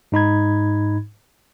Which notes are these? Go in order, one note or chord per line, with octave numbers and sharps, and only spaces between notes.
G#2 D#4 B5 G#6